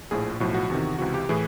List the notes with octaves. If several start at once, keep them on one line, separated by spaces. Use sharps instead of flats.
A#1 A2 F3 G#4
B1 A2 F3 F#4
F#4
E2 C3 D#3
C#2 C3 E3 F#4
G4
A2 E3 G#4